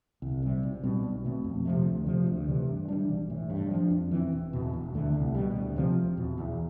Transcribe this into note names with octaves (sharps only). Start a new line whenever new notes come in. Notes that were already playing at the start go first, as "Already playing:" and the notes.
C2
C3 G3
B1
B2 G3 C4
B1
B2 A3 C4
F2
C3 F3 A3
D2
C3 F3
D2
C3 E3
G2
E3 G3 D4
B1
A2 E3
G2
F3 A3 D4
F2
E3 G3 C4
E1
E2 B2
E1
D2 D3 A3
C2
B2 G3
D2
C3 F3 C4
E1
E2 B2
E2